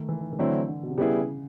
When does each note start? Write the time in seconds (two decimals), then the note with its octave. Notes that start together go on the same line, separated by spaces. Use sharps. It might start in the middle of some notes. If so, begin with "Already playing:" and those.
Already playing: D#3 A3
0.09 E3
0.21 D#3
0.33 E3
0.39 D3 F#3 A3 C4 E4
0.68 D3
0.83 B2
0.90 C3
0.98 C#3 G3 B3 E4 G#4